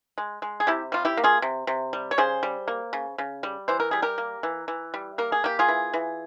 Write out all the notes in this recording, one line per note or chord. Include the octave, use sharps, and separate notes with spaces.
G#3
G#3
G#4
C3 E4 G4
G3 F4
E4 G4
A#3
F4 G#4
C3
C3
G3
C#5
C#3 G#4 C5
G3
A#3
C#3
C#3
G3
E3 C5
A#4
G3 G#4
G4 A#4
A#3
E3
E3
G3
A#3 A#4
G#4
A#3 G4
F4 G#4
E3
E3